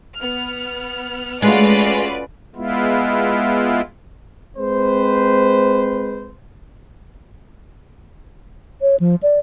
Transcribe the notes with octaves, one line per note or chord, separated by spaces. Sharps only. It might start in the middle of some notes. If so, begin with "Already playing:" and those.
B3 F6
G#3 A3 C#4 F4 F#4 B4 D5
G#3 B3 E4 F4
G#3 C4 B4 C5
C#5
F3
D5